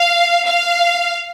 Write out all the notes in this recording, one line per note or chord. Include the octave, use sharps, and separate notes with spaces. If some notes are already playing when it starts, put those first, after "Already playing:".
Already playing: F5
F5